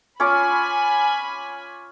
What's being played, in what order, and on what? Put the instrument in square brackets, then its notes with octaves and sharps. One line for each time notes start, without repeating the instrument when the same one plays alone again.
[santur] C#4 F4 D6 [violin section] G#5 B5